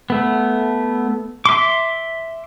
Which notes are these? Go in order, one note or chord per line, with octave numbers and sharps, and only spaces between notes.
A3 B3
E5 C6 D6